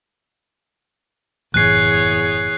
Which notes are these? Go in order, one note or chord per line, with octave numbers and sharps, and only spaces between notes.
F#1 E2 A2 E3 G#4 C#5 F#6 C7